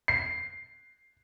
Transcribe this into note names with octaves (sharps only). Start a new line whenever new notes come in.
C7